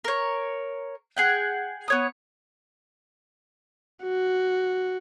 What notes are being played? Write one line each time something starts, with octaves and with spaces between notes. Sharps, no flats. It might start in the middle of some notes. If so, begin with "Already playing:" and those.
A#4 C#5
G#4 F#5 G5
B3 C#5 D#6
F#4